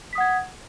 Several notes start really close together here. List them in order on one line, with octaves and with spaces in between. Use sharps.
B6 D#6 F#5 G#6